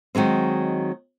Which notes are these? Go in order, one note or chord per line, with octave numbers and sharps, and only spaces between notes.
D#3 F#3 G#3 C4